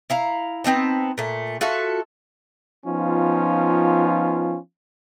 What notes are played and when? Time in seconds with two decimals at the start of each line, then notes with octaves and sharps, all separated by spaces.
0.10 E4 F5 A#5
0.64 B3 C4 D#4 A5
1.18 A#2 A3
1.61 F4 F#4 A4 E5
2.86 F3 B3 C#4 D#4 F4